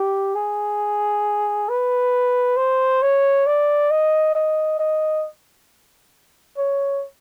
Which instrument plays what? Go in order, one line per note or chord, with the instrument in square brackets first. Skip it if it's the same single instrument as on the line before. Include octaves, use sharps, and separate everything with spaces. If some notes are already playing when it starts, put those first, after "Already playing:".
Already playing: [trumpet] G4
G#4
B4
C5
C#5
D5
D#5
D#5
D#5
C#5